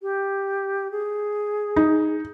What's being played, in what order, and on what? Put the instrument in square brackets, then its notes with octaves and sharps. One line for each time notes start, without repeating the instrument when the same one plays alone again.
[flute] G4
G#4
[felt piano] D#4